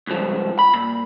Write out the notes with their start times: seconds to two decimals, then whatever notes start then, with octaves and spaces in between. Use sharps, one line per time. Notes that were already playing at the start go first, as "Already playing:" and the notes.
0.07 C#2 G2 F3
0.59 B5
0.74 A#2